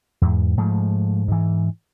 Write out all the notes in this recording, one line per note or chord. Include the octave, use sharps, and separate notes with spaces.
E2 G#2
G#2 F3 A3
G#2 E3